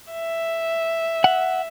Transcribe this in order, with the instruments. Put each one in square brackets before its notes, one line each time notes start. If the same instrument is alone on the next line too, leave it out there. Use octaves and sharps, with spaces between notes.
[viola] E5
[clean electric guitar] F#5